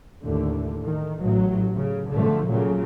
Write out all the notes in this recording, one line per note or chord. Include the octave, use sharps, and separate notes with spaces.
D#2 A2 D3
D#3
A1 A2 F#3
C#3
D3 F3 A3
A#2 C#3 F#3